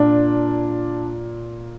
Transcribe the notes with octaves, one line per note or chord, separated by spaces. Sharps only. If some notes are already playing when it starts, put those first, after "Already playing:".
Already playing: A#2 D4